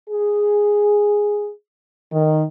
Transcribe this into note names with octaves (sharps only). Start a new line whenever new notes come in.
G#4
D#3